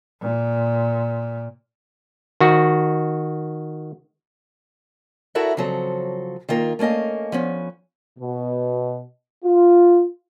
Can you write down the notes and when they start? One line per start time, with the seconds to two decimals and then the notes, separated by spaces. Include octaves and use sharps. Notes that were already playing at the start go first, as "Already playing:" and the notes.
0.21 A#2
2.40 D#3 F#4
5.35 E4 F#4 A4 A#4 E5 F#5
5.57 C#3 F3 F#3 C4 A4
6.49 D#3 A#3 F4 A#4
6.79 A3 A#3 C#4 D#5 F5
7.32 F3 B3 C#4
8.18 B2
9.45 F4